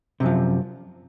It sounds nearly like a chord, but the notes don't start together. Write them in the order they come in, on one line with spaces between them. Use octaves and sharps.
C3 F#2 F3